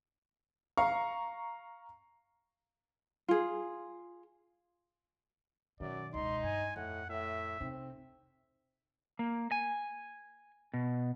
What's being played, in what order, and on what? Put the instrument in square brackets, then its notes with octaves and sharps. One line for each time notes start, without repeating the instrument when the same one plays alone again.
[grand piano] F5 A#5 C#6
[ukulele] F4 G#4
[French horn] F#2 [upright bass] B2 D#3 [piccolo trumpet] D5
[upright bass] E1 C#2 [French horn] D#4 [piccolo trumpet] C6
[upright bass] G2 [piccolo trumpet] G#5
[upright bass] F2 [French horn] A2 [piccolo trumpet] F#5
[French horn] A2 [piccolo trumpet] E5
[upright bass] C3 D#4 [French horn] C4
[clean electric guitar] A#3
G#5
B2